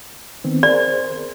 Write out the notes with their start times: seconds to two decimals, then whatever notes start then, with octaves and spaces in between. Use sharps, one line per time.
0.44 D#3 B3 C4
0.63 G#4 A#4 C5 D5